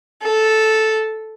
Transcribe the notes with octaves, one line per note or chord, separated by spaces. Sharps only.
A4